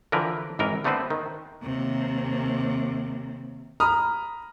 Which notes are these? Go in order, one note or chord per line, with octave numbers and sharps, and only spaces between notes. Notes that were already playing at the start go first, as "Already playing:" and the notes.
D3 E3 F3 A#4 B4
G#1 E3 A#4 D#5
D3 A3 B3 C4 B4 C5
D#3
D#2 C3
A#5 B5 D#6 F6